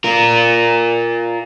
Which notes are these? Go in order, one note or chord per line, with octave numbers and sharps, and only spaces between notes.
F4 A#4